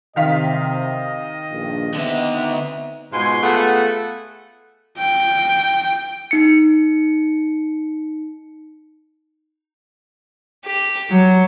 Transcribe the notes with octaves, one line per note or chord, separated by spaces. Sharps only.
C3 D#3 D#5 F5 B6
A#1 G2
D3 B3 C4 D#4 E5
G#2 B2 G#3 F4 G#5 C6
A3 B3 F4 G#4 A4 F#5
G5
D#4 C#7
G4
F#3